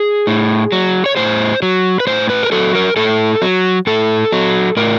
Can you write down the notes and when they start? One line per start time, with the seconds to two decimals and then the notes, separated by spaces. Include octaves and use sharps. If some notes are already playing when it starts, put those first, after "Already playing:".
Already playing: G#4
0.27 A2
0.72 F#3
1.06 C#5
1.17 A2 C5
1.62 F#3
2.00 B4
2.07 A2 C5
2.30 B4
2.43 A#4
2.52 F#3 A4
2.75 A#4
2.97 A2 A4
3.42 F#3
3.87 A2 A4
4.32 F#3
4.77 A2 A#4